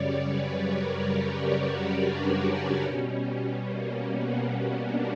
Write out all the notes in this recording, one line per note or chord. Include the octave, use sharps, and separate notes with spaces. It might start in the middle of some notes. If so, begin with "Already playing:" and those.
Already playing: F#2 C#3 G3 C#5 D5
B4
A#4
G4
F#4
D4
C#4
B2 G3
A#3
B3
C#4
D4